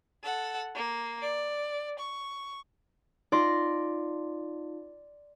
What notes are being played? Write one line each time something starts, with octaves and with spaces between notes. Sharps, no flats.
A4 F#5
A#3
D5
C#6
D#4 F4 D5 C6 A#6